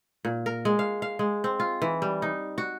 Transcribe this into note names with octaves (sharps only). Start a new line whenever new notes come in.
A#2
A#4
G#3
F5
F5
G#3
C4
F4
E3
G3
D#4
F#4